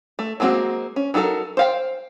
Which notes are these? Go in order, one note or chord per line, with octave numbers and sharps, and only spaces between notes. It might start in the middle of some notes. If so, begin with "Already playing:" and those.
A3
F#3 G#3 A#3 C4 F#4
C#4
F#3 D#4 E4 A4 A#4
C5 F5 G5